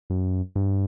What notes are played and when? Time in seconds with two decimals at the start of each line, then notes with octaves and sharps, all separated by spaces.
0.10 F#2
0.56 G2